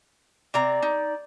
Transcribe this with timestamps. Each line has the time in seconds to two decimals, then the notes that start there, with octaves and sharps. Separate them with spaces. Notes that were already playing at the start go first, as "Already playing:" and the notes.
0.54 C3 D5 A#5
0.82 D#4